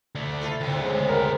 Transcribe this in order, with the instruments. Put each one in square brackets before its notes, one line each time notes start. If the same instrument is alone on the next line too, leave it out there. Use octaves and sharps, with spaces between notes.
[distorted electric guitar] D2 D3
[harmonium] E4 [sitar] F4 A4
[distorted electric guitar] D2 B3 [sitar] C3 C4
[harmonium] C#3 G#3
[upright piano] A#4